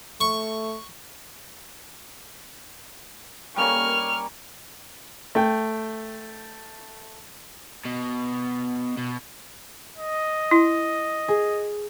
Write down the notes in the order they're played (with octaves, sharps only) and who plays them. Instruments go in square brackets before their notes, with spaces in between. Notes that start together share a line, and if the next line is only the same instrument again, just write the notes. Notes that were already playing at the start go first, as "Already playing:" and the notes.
[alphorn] A3 [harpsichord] C#6
[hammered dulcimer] G3 A#3 C#4 [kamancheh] C#6 F6
[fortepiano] A3 G5
[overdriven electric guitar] B2
B2
[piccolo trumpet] D#5
[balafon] E4
[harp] G#4